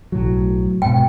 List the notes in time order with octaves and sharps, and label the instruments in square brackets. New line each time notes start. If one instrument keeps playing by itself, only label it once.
[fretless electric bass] B1 A2 F#3
[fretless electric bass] G#2 B2 [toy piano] G5